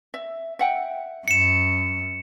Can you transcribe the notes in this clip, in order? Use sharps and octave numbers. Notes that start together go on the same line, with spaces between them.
E5
E5 F#5 G5
F#2 C#7 E7